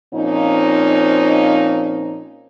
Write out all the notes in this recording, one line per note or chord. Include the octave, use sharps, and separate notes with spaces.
A#2 F3 C4 C#4 D#4